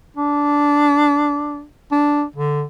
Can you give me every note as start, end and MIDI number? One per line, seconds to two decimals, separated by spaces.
0.17 1.64 62
1.92 2.24 62
2.36 2.63 50